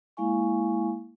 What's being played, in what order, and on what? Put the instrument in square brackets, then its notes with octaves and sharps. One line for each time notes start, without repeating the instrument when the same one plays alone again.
[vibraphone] G#3 A#3 E4 F5 G#5 C#6